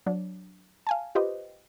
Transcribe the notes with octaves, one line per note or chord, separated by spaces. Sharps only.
F#3 D4
F5 G#5 A5
F4 G4 B4 C5 D#5